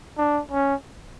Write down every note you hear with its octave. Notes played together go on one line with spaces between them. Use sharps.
D4
C#4